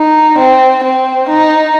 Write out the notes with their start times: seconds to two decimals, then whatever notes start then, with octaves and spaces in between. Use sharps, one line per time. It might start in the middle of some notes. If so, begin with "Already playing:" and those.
Already playing: D#4
0.38 C4
0.84 C4
1.29 D#4